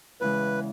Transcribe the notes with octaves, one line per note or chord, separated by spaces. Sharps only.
E2 C#3 E3 G#3 B4